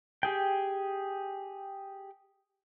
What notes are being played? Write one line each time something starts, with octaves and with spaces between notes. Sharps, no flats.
G4 G#4 G5